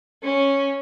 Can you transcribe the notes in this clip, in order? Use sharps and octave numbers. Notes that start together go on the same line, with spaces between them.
C#4